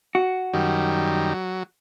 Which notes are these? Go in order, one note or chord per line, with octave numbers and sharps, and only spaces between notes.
F#4
F#2 D#3 G3
F#3